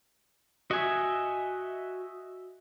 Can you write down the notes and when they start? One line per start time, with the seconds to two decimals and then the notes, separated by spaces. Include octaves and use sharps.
0.71 F#4 D#5 E5 G#5